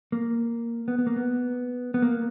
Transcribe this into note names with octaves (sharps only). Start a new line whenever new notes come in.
A#3
B3
B3
A#3
B3
B3
A#3